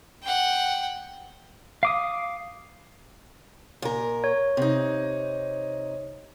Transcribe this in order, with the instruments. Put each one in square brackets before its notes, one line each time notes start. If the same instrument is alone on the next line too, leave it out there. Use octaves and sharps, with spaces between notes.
[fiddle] F#5 G5
[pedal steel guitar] F5 D6 D#6
[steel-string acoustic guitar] A#2 A#4
[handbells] C#5
[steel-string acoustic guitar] C3 D#4